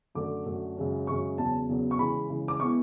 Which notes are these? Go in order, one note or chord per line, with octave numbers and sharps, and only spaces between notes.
F#2 D3 A3 D6
F#2 D3 A3
F#2 C#3 G#3 C#4
F#2 C#3 G#3 C#4 C#6
E2 C#3 F#3 A5
E2 C#3 F#3
C#6
C#3 E3 G#3 B5
C#3 E3 G#3
D6
G#3 B3 E4 C#6